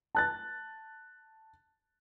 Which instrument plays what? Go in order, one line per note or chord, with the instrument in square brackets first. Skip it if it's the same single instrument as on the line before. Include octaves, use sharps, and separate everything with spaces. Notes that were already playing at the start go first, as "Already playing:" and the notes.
[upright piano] A5 F#6 A6